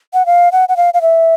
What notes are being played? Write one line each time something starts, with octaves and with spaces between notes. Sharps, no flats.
F#5
F5
F#5
F#5
F5
F5
E5